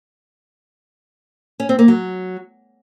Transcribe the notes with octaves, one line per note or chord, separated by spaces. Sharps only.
C#4
C4
A#3
F#3